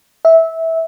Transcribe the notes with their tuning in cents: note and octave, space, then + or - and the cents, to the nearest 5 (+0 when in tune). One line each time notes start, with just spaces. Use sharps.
E5 -15